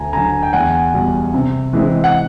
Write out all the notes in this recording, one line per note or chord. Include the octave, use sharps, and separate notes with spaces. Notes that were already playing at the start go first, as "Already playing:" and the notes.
Already playing: D2 G#5 A#5
D3 F#3 G#5 A#5
G5
E2 F#5 G#5
B2 G3
C3
E3 G#3 C4 D#4
F#5